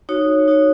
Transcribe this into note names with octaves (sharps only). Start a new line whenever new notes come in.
D#4 F#4 C#5
D#4 F#4 C#5